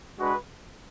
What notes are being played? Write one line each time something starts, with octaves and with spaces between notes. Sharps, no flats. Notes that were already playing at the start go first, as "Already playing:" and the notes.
G#3 D4 F#4 B4